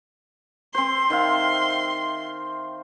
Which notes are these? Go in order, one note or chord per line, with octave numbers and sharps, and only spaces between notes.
C4 C5 C6
D#3 E5 F5